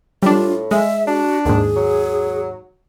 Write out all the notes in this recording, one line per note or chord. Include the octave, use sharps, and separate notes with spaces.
A2 G3 D4 F4
G#3 E5
D4 F#4
D#2 G#2 G#4
F#3